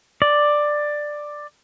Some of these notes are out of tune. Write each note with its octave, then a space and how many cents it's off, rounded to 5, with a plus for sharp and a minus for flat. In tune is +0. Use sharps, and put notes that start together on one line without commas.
D5 +10